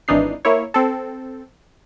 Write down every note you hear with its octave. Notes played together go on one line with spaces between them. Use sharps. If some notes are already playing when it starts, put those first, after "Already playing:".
G#1 E3 D4 D#4 C7
A#3 E4 C#5
C4 A4